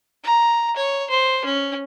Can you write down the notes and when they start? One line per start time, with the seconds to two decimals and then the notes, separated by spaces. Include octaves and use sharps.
0.24 A#5
0.76 C#5
1.10 C5
1.45 C#4